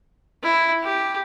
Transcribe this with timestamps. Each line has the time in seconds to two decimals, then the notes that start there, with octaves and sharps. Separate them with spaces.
0.43 E4
0.83 G4